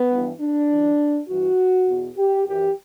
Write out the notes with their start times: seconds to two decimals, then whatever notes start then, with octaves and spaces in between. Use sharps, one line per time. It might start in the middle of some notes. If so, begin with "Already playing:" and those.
Already playing: B3
0.10 G2 E3
0.40 D4
0.69 F#2 E3
1.27 G2 E3 F#4
1.87 E2 B2
2.16 G4
2.45 F#2 E3 G4